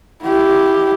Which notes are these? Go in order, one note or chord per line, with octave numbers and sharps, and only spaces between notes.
E4 G4